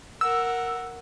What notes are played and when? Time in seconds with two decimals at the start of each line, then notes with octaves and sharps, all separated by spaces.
0.21 A#4 F#5 E6